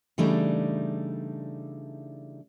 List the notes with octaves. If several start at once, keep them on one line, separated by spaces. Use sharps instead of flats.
C#3 E3 G3 A3 D4 D#4